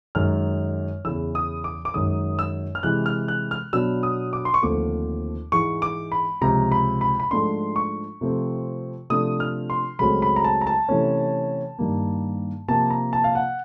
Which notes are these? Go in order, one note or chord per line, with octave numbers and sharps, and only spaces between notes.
F#2 D#3 G#3 F6
E2 C#3 E3 E6
D#6
D6
D6
F#2 D#3 G#3 D#6
E6
F6
C3 E3 G#3 F#6
F6
F#6
F6
B2 F#3 B3 D4 E6
D#6
D6
C6
C#6
D#2 D3 F3 A3 C4 D6
G#2 E3 G#3 C#6
D6
B5
C#2 C3 F3 A#5
B5
B5
B5
G#2 F3 A3 D4 C6
C#6
C3 F3 A3 C4
C3 F3 A3 D4 D#6
F6
C6
C#2 C#3 F#3 A3 C4 B5
B5
A#5
A5
A#5
A5
C3 E3 A3 C#4
G2 D#3 G3 A#3
C3 F3 A#3 A5
A#5
A5
F5
F#5